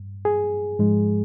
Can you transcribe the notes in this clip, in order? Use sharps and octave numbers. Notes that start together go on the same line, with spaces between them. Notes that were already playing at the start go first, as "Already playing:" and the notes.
Already playing: G2
G#4
G#2 F3 G#3